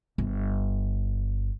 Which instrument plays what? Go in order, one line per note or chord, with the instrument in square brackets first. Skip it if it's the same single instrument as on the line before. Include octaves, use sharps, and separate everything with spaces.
[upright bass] G1